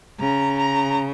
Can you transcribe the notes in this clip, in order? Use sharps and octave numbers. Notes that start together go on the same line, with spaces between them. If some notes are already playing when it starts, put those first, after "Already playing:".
C#3 A#5
A#5